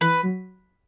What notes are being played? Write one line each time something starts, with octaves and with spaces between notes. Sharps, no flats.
E3 B4
F#3